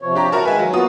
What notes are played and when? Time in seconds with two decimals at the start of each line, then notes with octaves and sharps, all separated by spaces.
0.02 C3 F3 C#5
0.15 D4 G4 A#5
0.32 E4 F#4 A#4 A5
0.45 D#3 G#3 B4 E5 F5 G#5
0.59 F#3
0.73 A#3 B3 F4 F#4 D#6